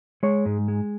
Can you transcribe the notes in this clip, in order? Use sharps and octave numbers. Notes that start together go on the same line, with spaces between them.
G#3 C#5
G#2
G#3